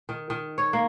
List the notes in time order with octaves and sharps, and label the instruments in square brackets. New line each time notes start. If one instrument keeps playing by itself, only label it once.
[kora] D#3
D#3
C#5
A#3